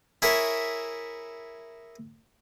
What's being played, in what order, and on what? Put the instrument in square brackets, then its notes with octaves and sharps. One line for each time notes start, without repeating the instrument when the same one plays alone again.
[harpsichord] E4 G#4 A#4 C#5 E5